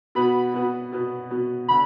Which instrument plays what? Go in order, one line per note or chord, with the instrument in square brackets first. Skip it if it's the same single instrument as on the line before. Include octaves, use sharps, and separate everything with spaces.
[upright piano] B2 B3 F#4 B4 [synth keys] B5
[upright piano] B2 B3 F#4 B4
B2 B3 F#4 B4
B2 B3 F#4 B4
[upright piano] D3 [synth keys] B5